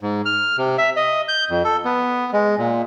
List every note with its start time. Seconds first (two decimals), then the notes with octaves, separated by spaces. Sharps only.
0.01 G#2
0.25 F6
0.58 C3
0.78 E5
0.96 D#5
1.28 G6
1.50 F2
1.64 A4
1.85 B3
2.33 G#3
2.58 A#2